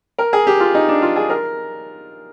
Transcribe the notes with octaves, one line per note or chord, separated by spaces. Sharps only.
A#4
G#4
G4
F4
D#4
D4
F4
G#4
A#4